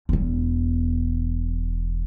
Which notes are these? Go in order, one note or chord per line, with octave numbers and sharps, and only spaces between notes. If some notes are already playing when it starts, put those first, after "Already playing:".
E1 E2